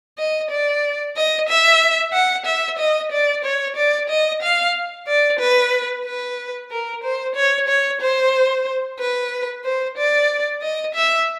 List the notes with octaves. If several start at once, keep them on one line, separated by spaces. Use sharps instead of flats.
D#5
D5
D#5
E5
F#5
E5
D#5
D5
C#5
D5
D#5
F5
D5
B4
B4
A#4
C5
C#5
C#5
C5
B4
C5
D5
D#5
E5